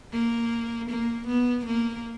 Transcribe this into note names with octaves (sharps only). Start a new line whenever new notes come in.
A#3
A#3
B3
A#3